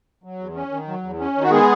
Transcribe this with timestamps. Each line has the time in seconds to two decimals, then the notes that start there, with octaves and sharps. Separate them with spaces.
0.24 F#3
0.39 E2
0.55 C#4
0.71 D#3
0.88 F#3
1.03 E2
1.19 C#4
1.36 D#3
1.43 F#4
1.51 G#3 B3 G#4